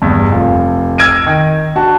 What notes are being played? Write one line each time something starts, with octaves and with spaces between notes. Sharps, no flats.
E2 G2
F1 F4
E6 F6 G#6 A#6 D7 D#7
D#3
D4 F#4 A5